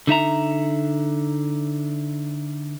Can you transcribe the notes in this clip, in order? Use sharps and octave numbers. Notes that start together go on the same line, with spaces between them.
D3 D#4 E5 A#5